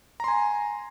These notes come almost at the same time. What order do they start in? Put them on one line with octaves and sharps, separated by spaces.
A#5 C6 G#5